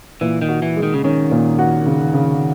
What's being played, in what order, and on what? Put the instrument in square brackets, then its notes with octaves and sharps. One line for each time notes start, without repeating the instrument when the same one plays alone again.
[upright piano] A#2 [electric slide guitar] E3
[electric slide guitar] D#3
[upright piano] F#4
[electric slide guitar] E3
[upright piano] G#3
[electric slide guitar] D#3
C#3
[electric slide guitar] D#3 [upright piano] C#4
[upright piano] A#2
F#4
C#3
C#3